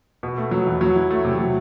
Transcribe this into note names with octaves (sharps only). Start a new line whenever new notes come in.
B2
A3
F#3
E2
F#3
E4
A3
C3
F#3